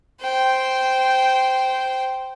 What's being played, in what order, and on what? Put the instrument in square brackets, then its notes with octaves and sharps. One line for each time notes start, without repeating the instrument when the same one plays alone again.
[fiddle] C5 G5